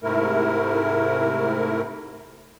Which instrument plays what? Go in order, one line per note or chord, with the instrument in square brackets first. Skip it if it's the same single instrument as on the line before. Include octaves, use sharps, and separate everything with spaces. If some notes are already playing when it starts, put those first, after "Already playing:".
[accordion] G#2 C3 A3 E4 A#4